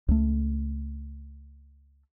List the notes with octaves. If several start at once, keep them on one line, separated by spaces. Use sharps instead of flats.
C#2 A3